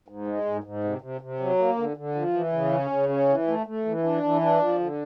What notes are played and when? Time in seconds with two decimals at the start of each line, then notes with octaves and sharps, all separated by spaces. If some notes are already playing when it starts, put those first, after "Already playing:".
0.08 G#2
0.27 G#3
0.45 G#2
0.64 G#2
0.84 C3
1.01 C3
1.21 C3
1.40 F#3
1.58 A#3
1.77 D3
1.97 D3
2.15 F3
2.34 E3
2.52 C#3
2.72 C#4
2.90 C#3
3.09 C#4
3.29 E3
3.48 A3
3.66 A3
3.85 E3
4.04 D4
4.23 E3
4.41 D4
4.60 F3
4.80 D3